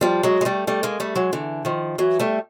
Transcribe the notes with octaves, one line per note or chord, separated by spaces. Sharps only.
F3 G3
F#3 G#3
G#3
G3 A3
G3 A3
G#3 A#3
G3 A3
F#3 G#3
D3 E3
D#3 F3
E3 F#3
G3 A3